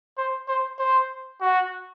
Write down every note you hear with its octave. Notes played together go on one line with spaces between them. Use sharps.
C5
C5
C5
F#4